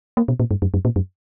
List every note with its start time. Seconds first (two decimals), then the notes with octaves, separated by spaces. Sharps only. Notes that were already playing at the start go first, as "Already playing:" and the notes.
0.17 A#3
0.28 B2
0.40 A#2
0.51 G2
0.62 F#2
0.74 F#2
0.85 A#2
0.96 F#2